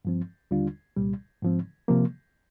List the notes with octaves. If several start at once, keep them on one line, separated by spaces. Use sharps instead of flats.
G2 F3 C4
D#2 D3 G3 D4 F4
C2 A#2 G3
G#2 F3 C4
C3 F3 A#3